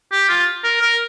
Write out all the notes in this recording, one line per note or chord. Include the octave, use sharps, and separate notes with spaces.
G4
F4
A#4
A#4